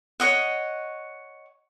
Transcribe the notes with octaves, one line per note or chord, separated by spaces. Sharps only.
C#5 D#5 F#5